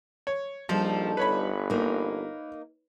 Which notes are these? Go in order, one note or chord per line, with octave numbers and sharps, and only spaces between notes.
C#5
A#1 F3 G3 D#4 A4
G1 B4 C#5 B5
A#3 D#4